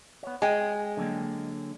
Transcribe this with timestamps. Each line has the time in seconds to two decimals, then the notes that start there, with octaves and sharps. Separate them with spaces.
0.23 B3 C#5
0.42 G#3 G5 G#5
0.97 D3 F#3 A#3